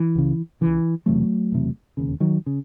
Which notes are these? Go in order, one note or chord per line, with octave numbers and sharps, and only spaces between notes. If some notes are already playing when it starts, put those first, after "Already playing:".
Already playing: E3
C#2 C#3
C#2 C#3 E3
E1 E2 C3 F#3 A3
E1 E2 C3
E1 D#2 C#3
D#3 F#3
C#3